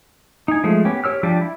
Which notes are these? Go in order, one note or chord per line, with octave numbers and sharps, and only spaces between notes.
D#4 G#5
F3 G#3 A3
B3 C#4 G4
G4 C#5 E6 F6
F3 G3 D4 G4 D5
E4